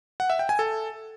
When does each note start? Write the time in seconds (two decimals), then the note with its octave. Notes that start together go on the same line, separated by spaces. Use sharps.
0.20 F#5
0.30 E5
0.39 G5
0.49 G#5
0.59 A4